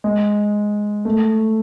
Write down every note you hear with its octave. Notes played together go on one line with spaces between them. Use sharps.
G#3
A3